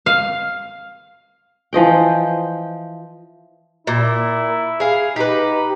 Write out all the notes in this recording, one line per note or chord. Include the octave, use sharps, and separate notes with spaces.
F5
E3 F3 D#5 G5
A#2 E4
G#4 F5
D#4 G4 B4